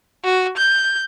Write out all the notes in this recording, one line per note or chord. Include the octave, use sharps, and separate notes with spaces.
F#4
G6